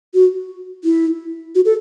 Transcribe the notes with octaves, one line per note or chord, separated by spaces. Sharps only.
F#4
E4
F#4
A4